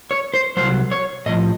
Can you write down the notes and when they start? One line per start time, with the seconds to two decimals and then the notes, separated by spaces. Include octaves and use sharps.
0.11 C#5
0.34 C5
0.57 C2 A#2 F#3 C5
0.91 C#5
1.26 A2 D#5
1.29 F3